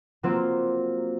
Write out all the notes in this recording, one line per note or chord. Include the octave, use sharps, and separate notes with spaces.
F#3 A#3 C4 F4